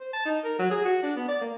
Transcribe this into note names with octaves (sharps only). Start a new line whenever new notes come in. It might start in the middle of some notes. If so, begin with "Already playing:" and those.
C5
A5
D#4
A#4
F#3
G#4
F#4
D4
B3
D5
A#3